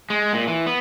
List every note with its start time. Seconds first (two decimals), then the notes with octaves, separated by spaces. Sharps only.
0.10 G#3
0.33 A#2
0.47 E3
0.66 B3